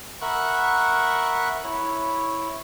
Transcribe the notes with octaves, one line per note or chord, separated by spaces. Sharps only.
A#4 E5 F#5 B5 C#6 F#6
E4 C#5